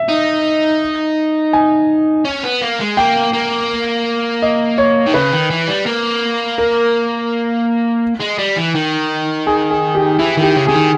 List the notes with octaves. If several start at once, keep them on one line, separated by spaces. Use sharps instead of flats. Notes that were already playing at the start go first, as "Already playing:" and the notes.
Already playing: E5
D#4
G#5
C#4
B3
A#3
G#3
A#3 G5
A#3
D#5
C#5
D#3
C#3 B4
D#3
E3
G3
A#3
A#4
G#3
G3
E3
D#3
G#4
G#4
G4
E3 E4
D#3
G4
C#3
C#3 G#4
D#3